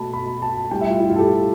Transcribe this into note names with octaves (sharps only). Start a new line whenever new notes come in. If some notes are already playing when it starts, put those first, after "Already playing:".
Already playing: B2 A3 A5 B5
B5
A5
A2 G3 G5
E5
F4
E4
F4
A4
G4